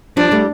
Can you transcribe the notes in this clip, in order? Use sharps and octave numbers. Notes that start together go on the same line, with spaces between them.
F3 G3 D4
G3 A3